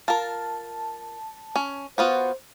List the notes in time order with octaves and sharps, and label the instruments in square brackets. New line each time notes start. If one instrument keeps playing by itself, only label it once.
[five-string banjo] F4 A#4 [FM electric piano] A5
[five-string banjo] C#4
[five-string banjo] B3 F4 F#4 [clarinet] C5